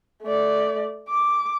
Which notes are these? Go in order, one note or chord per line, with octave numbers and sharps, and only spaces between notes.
A3 D5
D6